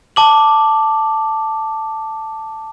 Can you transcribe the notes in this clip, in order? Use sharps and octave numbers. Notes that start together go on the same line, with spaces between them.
A5 D6 F#7